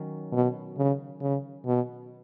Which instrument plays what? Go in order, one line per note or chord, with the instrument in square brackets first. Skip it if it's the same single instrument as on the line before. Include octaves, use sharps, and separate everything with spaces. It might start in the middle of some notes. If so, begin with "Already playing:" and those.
Already playing: [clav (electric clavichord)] D#3 F#3 C#4
[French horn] B2
C#3
C#3
B2